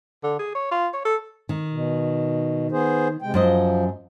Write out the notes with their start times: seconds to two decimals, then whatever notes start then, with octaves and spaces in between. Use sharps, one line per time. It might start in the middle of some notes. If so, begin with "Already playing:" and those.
0.24 D3
0.39 G#4
0.55 C#5
0.71 F4
0.94 C#5
1.05 A4
1.49 D#3
1.70 B2
2.72 B3 G#4 C5
3.22 C3 G#3 G5
3.34 F#2 F3 C5 D#5